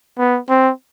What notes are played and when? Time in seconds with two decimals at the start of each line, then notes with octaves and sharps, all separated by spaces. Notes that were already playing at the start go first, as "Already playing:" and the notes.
0.18 B3
0.49 C4